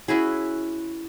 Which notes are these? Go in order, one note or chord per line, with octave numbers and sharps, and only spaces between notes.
C#4 E4 F#4 G#4